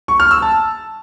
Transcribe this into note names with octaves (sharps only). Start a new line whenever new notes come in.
C#6
F6
E6
A5